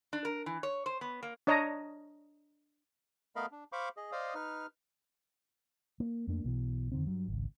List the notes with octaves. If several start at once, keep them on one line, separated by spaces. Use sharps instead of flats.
D4
A#4
E3
C#5
C5
B3
A#3
D4 C#5 D#5 A#5
A3 B3 A#4 D#5 F5 B5
D4
C5 F5 B5 C#6 D6
G#4 D#5
C5 D5 D#5 F5 D#6
D#4 B4 F6
A#3
F2 A3 A#3 D4
B1 B2 E3
F2 D3 D#3 C4
G2 F#3
G#1 C#2